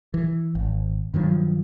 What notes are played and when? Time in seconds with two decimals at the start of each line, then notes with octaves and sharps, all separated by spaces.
0.14 E3
0.55 G#1
1.14 G2 D#3 F3 F#3